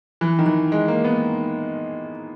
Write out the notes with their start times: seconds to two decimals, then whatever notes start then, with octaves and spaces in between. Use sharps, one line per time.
0.21 E3
0.39 D#3
0.46 E3
0.72 G#3
0.88 A#3
1.04 B3